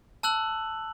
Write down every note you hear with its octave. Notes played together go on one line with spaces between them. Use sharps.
A5 E6 F#6 F#7